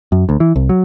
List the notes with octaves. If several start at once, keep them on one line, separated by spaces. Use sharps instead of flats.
F#2
D2
E3
C2
F#3